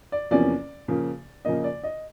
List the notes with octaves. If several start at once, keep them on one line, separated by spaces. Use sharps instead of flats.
D5
E2 C3 F3 A#3 C#4 D5
C#3 F3 A#3
C#3 F3 A#3 D#5
D5
D#5